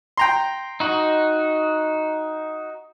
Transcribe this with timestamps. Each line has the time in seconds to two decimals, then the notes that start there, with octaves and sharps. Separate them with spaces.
0.17 G5 A#5 C6
0.80 D#4 F#4